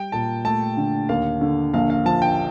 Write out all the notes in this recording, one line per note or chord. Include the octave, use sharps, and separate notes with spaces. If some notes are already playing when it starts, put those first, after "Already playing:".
Already playing: G3 G5
A#2 A5
A3 A5
D3
D#2 F5
D3
A#1 F5
F5
F3 A5
G5